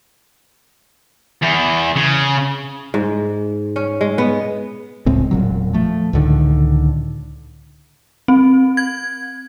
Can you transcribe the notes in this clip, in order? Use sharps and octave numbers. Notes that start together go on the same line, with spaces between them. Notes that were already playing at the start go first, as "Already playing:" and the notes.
E2
C#3
G#2
C#4
G#3
B3
C#2 A2 G#3 C4
E1 A#2 F#3
F3 A3
C#2 A2 D3 D#3
C4
G#6